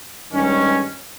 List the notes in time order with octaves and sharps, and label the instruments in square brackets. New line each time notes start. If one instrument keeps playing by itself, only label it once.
[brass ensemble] G2 D#3 G#3 C#4